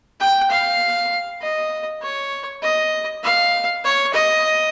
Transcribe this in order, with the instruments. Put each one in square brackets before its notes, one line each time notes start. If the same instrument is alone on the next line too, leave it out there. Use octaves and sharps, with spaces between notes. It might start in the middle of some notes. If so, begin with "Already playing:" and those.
[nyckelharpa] G5
F5
D#5
C#5
D#5
F5
C#5
D#5